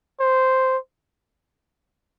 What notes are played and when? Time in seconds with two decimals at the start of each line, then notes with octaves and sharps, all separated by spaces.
0.20 C5